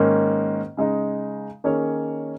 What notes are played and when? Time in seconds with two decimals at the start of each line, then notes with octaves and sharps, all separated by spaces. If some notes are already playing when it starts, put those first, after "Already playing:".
Already playing: G#2 D#3 A#3 C#4
0.77 C#3 G#3 D#4
1.64 D#3 A#3 C#4 G#4 C#5